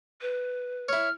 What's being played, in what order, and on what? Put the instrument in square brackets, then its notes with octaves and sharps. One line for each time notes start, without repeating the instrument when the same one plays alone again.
[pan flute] B4
[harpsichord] E4 C#5 [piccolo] F6